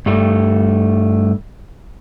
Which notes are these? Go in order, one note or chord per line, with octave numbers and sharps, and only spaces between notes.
G2 G3 A3